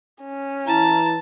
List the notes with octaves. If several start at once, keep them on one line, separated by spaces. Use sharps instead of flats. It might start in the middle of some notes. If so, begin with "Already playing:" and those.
C#4
E3 E4 A5 A#5